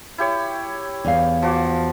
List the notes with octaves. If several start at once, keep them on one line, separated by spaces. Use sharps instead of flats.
E4 G4 C#5
E2 F5
F3 F#4 D6